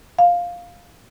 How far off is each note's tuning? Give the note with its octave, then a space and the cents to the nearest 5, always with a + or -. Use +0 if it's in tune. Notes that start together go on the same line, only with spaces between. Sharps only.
F5 +5